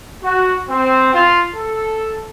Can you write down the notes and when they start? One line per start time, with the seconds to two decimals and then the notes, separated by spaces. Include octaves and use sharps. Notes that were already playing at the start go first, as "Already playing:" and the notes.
0.24 F#4
0.68 C4
1.14 F4
1.55 A4